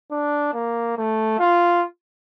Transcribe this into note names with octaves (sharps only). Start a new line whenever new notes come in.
D4
A#3
A3
F4